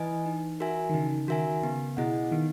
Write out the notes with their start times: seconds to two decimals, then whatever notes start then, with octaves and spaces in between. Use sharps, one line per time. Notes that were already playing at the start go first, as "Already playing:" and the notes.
Already playing: E3 E4 B4 D#5 G#5
0.26 D#4
0.60 F#4 A#4 E5 G#5
0.89 D#3
0.94 C#3 D#4
1.28 D#3 F#4 A#4 E5 G#5
1.63 C#3 B3
1.97 B2 E4 G#4 D#5 F#5
2.31 D#3 B3